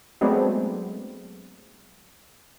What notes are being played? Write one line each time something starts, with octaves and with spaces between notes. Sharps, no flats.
F#3 G#3 A3 B3 C4 D4